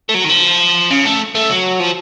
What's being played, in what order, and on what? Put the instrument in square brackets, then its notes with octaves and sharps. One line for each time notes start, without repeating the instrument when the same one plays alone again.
[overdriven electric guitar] A3
F#3
D#3
F3
C#3
A3
A3
F#3
F3